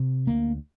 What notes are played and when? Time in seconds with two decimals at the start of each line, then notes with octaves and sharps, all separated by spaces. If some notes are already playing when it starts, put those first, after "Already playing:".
Already playing: C3
0.27 D2 A#3